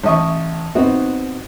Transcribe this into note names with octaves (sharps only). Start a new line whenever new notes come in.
A1 D#5 C#6
F#3 B3 C4 D#4 F#4